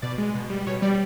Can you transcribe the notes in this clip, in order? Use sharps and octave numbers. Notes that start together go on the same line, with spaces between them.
B2 D5
G#3
B2
G3
B2 C#5
G3 D5